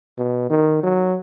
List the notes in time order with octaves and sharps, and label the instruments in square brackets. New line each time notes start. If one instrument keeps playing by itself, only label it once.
[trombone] B2
D#3
F#3